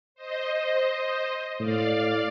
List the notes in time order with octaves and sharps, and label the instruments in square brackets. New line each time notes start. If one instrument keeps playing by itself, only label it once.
[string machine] C5 D#5
[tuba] A2 [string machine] D5 F5